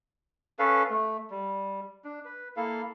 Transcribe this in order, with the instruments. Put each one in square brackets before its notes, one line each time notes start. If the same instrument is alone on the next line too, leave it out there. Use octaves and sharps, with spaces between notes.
[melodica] C#4 A4 B4 F5
A3
G3
D4
B4
A#3 E4 A4 F5